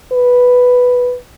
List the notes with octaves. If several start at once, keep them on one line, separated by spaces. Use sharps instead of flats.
B4